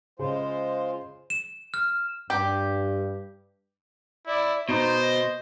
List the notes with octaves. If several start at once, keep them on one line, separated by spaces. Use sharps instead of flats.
C#3 G#3 F4 C5
E7
F6
G2 G4
E4 D5
B2 D#4 C5
D#5